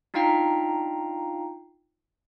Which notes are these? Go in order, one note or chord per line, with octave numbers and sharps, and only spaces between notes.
D4 D#4 F4 F5 G5 A#5